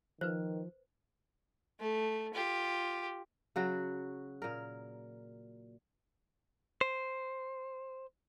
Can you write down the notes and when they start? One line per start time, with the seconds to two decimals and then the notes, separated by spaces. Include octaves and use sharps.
0.21 D#3 F3 B4 C5
1.80 A3
2.34 F4 G4
3.56 C#3 F#3 F#4
4.42 A#2 A#4
6.81 C5